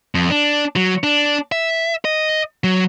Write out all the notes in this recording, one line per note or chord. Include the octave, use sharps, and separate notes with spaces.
F2
D4
F#3
D4
E5
D#5
F#3